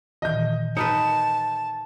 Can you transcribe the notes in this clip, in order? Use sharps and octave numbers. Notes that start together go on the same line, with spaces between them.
A#2 D#3 E3 D#5 G6
D#4 A#4 B4 A5 C#7